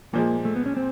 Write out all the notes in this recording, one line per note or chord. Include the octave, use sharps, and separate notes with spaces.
A#2 F3 G#3 A#3
A3
B3
C#4
C4